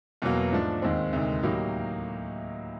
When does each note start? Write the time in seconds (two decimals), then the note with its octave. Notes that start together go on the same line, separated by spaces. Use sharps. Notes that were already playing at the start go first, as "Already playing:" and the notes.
0.22 E2 B2 F#3 A#3
0.52 G#2 F3 A3 D4
0.82 D#2 D#3 G#3 C4
1.13 D2 C3 D#3 G#3
1.43 A2 F#3 A#3 D#4 G4